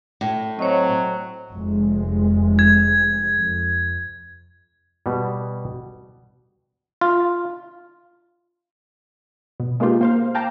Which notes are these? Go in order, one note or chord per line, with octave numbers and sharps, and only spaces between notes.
A2
F#3 C4 C#5 D#5
F1 C3 G#3
G#6
F2
B2 G3
F4
B2
G#3 A#3 B3 D#4 F4 G4
A#3 C5 F5
F5 G5 A5 A#5 D6